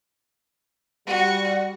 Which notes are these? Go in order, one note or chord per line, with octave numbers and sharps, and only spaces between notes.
G3 F#4